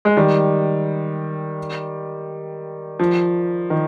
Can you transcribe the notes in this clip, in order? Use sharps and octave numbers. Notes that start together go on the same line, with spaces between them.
G#3
D#3 G3
F3
D#3